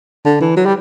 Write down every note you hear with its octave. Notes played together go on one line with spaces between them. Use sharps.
D3
E3
F#3
G3